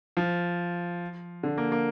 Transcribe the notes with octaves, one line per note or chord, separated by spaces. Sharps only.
F3
D3
A#3
A#3